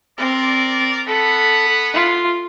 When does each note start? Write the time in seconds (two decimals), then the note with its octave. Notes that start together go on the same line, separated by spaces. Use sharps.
0.18 C4 A#4 D5
1.07 B3 A4 F#5 B5
1.94 F4